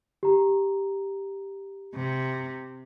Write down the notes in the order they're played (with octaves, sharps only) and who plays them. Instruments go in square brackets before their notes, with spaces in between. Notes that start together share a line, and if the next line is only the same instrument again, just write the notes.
[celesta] G4 A#5
[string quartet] C3